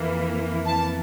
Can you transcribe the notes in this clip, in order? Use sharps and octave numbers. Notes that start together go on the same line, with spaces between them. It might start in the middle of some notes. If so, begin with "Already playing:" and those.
Already playing: F2 E3 A#3
A5